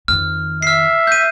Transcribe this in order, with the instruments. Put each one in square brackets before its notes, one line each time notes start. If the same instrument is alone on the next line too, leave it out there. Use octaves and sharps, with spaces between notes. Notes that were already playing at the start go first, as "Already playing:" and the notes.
[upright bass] F2 D#3 [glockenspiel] F6
[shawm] E5 [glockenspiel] F6 C7
[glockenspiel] G6 D#7